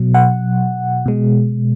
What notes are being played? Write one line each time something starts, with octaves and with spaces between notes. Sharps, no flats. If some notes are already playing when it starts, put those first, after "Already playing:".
Already playing: B2 F#3
F#5
B2 G#3